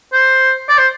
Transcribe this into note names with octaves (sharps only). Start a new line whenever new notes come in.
C5
D5
C5